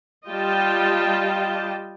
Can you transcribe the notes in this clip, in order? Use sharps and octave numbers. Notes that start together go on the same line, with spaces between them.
G3 F4 D#5 G5 A5